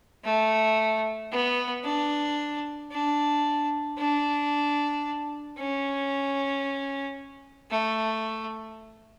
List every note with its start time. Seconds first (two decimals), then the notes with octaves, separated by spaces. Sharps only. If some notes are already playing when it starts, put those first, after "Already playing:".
0.24 A3
1.32 B3
1.84 D4
2.92 D4
3.98 D4
5.58 C#4
7.71 A3